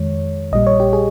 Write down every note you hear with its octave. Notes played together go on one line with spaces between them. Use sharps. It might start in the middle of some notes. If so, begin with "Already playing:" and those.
Already playing: F2 D#3 G#3 C#5
A#1 A#2 G3 D#5
C#5
G4
G#4